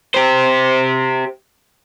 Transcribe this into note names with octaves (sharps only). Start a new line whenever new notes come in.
G4 C5